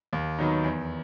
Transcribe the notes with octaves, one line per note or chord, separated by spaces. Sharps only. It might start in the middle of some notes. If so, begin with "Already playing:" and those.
D#2
D#3 F#3 B3 D#4
E2